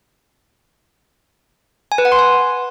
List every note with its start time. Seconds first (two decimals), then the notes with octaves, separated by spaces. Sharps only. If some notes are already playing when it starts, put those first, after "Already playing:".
1.92 G#5
1.98 B4
2.05 F#5
2.12 C6
2.19 G#5